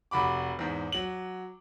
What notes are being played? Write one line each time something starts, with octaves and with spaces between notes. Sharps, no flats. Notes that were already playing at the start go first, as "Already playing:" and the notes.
F1 F#4 B5 D6
E2 G#2
F#3 F#7